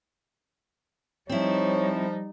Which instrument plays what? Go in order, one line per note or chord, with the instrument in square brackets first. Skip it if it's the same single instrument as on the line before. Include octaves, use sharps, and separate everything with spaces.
[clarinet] F3 [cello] G3 D#4 [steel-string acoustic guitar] C4 E4 [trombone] C#5